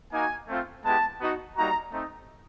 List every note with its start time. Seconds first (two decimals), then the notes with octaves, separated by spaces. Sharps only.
0.13 A#3 D#4 F#4 G#5
0.49 A3 C4 F4
0.85 G#3 B3 E4 G4 A5
1.21 B3 D#4 F#4
1.56 G3 A#3 D#4 F#4 A#5
1.93 A3 C4 D#4